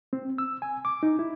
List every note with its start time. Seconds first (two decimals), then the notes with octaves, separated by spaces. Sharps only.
0.13 C4
0.38 E6
0.62 G#5
0.85 D6
1.03 D#4
1.19 E4